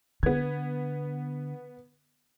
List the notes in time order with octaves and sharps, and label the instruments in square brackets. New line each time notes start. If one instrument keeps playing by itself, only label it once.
[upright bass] D3 [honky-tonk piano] B3 G#6